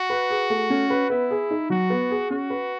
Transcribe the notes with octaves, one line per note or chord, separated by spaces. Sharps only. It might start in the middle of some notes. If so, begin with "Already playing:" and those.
Already playing: F#4
B4
G#4
A3
C#4
B4
B3 E4
G#4
D#4
F#3 F#4
B3
G#4
C#4 F#4
B4